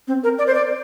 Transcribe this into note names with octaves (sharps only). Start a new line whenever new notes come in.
C4
A#4
D5
C5
D5